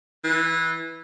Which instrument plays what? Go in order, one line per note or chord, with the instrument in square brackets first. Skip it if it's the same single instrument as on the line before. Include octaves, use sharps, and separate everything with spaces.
[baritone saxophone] E3